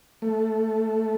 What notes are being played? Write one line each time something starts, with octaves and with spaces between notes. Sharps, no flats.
A3